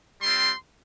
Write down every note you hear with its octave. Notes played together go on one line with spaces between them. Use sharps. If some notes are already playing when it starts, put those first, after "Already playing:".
G3 C4 F4 C6